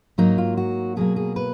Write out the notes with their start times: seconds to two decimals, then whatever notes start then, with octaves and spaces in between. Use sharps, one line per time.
0.18 G#2 F#3 A#3 D#4
0.38 F4
0.57 F#4
0.97 B2 F#3 A#3 G#4
1.16 G#4
1.36 B4